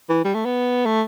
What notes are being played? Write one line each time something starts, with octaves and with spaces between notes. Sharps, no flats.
E3
G3
A3
B3
A3